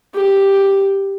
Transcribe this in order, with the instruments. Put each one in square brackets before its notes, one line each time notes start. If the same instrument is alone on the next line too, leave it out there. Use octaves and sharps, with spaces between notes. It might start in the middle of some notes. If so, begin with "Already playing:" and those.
[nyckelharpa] G4